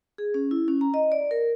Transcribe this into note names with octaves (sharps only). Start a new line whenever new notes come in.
G#4
C#4
E4
C#4
A#5
D#5
D5
A#4